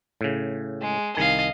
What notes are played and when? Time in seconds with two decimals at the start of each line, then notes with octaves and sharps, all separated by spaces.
0.21 A2 C#3
0.82 G#3
1.17 C2 D#3 D#5 F5 G#5